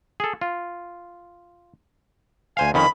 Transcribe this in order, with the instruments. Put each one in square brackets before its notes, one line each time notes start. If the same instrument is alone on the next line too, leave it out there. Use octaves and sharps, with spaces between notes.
[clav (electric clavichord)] G#4 A4
F4
[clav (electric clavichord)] D2 C5 F5 [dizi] G#5
[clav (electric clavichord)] F2 D#3 C#4 [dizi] B5